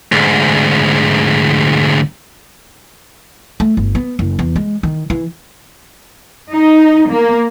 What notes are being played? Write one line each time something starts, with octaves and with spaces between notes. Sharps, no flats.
D2 G#2
A3
G1
B3
F#1
E2
G#3
D#3
E3
D#4
A#3